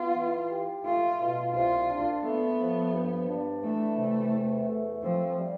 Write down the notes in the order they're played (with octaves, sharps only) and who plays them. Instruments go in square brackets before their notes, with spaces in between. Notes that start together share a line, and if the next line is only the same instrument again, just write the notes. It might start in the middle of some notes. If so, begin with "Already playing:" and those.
Already playing: [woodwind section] B3 [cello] F4
[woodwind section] E3
G4
[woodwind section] A3 [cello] F4
[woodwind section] B2
[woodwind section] C2 [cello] F4
[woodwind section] D4
[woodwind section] A3 [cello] B3
[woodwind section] F3
G2
D4
[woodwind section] E3 [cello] A3
[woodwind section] C3
E2
A3
[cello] F3 [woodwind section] C4
[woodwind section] G3